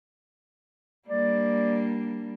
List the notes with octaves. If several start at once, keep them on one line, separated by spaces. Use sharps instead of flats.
G3 A#3 D4 D5